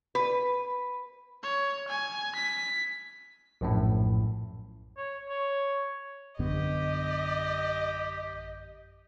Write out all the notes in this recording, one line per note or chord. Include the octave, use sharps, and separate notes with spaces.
B4
C#5
G#5
B6
A#1 F#2 A2
C#5
C#5
A1 F#2 D3 B3 G4 D#5